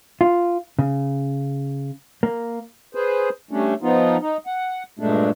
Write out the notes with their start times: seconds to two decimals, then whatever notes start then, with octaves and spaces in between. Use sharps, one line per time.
0.21 F4
0.79 C#3
2.23 A#3
2.95 G#4 B4 C5
3.51 G3 A3 C#4 D4
3.82 F3 B3 D#4 F4
4.21 D#4
4.47 F#5
4.99 G2 A#2 G#3 A3 D4